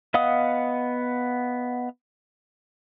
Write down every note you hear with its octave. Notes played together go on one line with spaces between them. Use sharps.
B3 D#5 F5 F#5 D#6